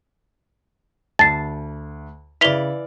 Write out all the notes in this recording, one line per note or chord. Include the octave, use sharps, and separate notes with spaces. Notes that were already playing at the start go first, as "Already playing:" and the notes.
D2 A5 A6 C7
C#3 E3 D5 F6 B6 F7 G7